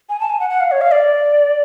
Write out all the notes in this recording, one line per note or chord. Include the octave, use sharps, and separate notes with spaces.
G#5
A5
G#5
F#5
F#5
F5
C#5
F5
D5